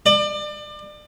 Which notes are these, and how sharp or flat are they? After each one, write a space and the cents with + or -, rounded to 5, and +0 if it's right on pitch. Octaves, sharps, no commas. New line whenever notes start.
D5 +30